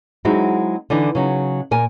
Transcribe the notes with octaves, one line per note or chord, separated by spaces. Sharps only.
F#3 G#3 C4 D#4 E4 F#4
D3 E3 D4 D#4
C#3 F#3 D#4
A#2 A#4 G#5